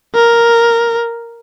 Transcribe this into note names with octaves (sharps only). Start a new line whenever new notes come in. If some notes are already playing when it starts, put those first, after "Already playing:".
A#4